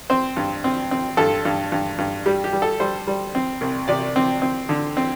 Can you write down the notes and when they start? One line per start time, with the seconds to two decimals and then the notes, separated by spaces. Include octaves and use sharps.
0.10 C4 C5
0.37 G2
0.64 C4
0.91 C4
1.17 G2 A4
1.45 G2
1.72 G2
1.98 G2
2.26 G3 G4
2.44 G4
2.53 G3
2.62 A4
2.80 G3 C5
3.07 G3
3.35 C4
3.61 C2
3.88 C3 D5
4.16 C4
4.42 C4
4.69 D3
4.97 C4